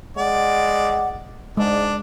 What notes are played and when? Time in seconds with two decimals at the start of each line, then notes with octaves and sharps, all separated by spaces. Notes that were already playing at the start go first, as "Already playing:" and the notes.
0.17 G#3 D5 F#5
1.57 G#2 G#3 D4 D5